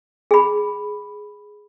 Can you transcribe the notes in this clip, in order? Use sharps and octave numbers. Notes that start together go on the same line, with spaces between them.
G#4 B5